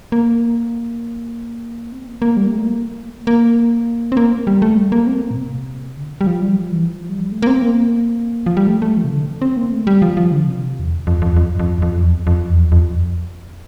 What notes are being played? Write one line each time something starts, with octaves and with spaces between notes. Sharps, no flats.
A#3
C4
A#3
A#3
G3
A#3
A3
A#3
A#3
C4
A#3
G3
A3
G3
A#3
C4
A#3
A#2
C3
D3
G3
F3
G3
F3
E3
F3
G3
A3
A#3
C4
A#3
F3
G3
A3
A3
F3
C3
D3
C4
A#3
A3
G3
F3
F3
D3
C3
E2
F2
F2
F2
F2
F2
F2
E2
F2
F2
E2
F2